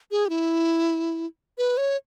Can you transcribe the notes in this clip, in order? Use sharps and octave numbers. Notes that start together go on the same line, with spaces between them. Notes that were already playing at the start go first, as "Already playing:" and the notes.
G#4
G4
E4
B4
C#5